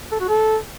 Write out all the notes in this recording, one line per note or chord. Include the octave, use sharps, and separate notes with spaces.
A4
F#4
A4